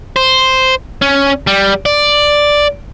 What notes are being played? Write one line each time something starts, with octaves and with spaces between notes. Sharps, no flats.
C5
C#4
G3
D5